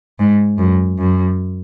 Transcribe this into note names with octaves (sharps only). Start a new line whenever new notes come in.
G#2
F#2
F#2